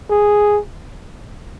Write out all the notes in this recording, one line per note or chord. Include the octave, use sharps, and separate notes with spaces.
G#4